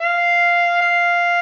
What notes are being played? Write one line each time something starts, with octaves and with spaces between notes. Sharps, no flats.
F5
F5